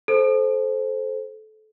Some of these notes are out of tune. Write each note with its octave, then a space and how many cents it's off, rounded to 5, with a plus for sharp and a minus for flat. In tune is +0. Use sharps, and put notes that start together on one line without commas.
A4 -25 C5 +0